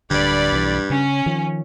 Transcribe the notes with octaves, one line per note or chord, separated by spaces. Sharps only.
D1 G2 D3 D5 B5
B1 E3
C#3 C#4
D#3 F3